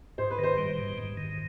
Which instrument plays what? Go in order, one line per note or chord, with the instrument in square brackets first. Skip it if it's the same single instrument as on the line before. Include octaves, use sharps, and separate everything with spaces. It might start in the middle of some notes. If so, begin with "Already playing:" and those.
[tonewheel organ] G#2 [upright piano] C5
[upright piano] B4
[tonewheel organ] D#3 [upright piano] C5
[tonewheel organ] G3
G#2
G#2
D#3